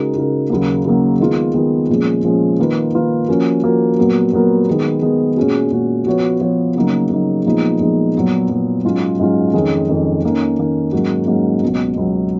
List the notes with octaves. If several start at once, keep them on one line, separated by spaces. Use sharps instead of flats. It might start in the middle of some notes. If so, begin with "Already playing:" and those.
Already playing: C#3 G#3 D#4 F#4 A#4
C#3 G#3 D#4 F#4 A#4
D#2 C#3 F#3 A#3
D#2 C#3 F#3 A#3
D#3 G#3 B3 F4
D#3 G#3 B3 F4
A#2 F3 G#3 C#4
A#2 F3 G#3 C#4
D#3 A#3 F4 B4
D#3 A#3 F4 B4
F3 A#3 C#4 F#4 A#4
F3 A#3 C#4 F#4 A#4
A#2 F#3 B3 F#4 A#4
A#2 F#3 B3 F#4 A#4
D#3 G#3 B3
D#3 G#3 B3
A#2 G#3 C#4 F#4
A#2 G#3 C#4 F#4
F3 B3 F#4 C#5
F3 B3 F#4 C#5
C#3 F#3 A#3 D#4
C#3 F#3 A#3 D#4
A#2 F3 G#3 B3 D#4
A#2 F3 G#3 B3 D#4
A#2 F#3 B3
A#2 F#3 B3
G#2 F#3 C#4 F4
G#2 F#3 C#4 F4
F2 D#3 G#3 C#4
F2 D#3 G#3 C#4
D#3 A#3 C#4
D#3 A#3 C#4
G#2 F#3 A#3 C#4 F#4
G#2 F#3 A#3 C#4 F#4
C#2 B2 F#3
C#2 B2 F#3